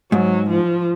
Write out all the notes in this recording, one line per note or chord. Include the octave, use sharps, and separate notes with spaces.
G#2 F#3
F3